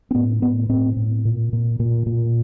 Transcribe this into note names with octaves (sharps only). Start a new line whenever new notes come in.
C4
A2 B3
A2 B3
A2 C4
A2
A#2
A#2
A#2
A#2